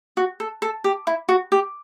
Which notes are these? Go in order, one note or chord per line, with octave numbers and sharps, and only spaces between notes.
F#4
A4
A4
G4
E4
F#4
G4